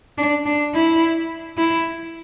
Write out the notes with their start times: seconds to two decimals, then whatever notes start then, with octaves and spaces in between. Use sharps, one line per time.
0.18 D4
0.46 D4
0.74 E4
1.57 E4